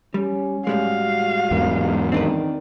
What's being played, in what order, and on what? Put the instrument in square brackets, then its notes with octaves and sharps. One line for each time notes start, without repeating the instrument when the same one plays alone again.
[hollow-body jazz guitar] G3 [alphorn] C#4
[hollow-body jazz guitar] A2 G3 G#3 [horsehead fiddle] F#4 F5
[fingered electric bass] E2 G#2 [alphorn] A#4
[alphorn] D#3 [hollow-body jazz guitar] C4 D4 B4